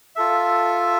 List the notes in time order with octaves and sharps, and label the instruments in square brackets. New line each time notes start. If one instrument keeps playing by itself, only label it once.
[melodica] F4 A4 E5